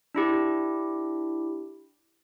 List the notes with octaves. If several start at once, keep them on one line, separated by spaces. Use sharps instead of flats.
D4 E4 G4